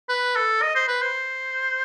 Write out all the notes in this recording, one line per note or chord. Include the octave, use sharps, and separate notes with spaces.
B4
A4
D#5
C5
B4
C5